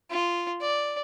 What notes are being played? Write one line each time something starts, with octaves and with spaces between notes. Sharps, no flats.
F4
D5